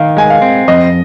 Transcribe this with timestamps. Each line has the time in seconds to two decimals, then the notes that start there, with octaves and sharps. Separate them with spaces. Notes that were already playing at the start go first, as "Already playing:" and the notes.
Already playing: D#3 A#4 F5
0.17 G#3 G#5
0.30 F5
0.42 C4
0.68 F2 D#5